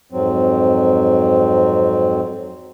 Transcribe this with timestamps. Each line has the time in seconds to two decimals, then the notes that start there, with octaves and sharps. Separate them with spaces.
0.12 F2 G#2 F#3 C4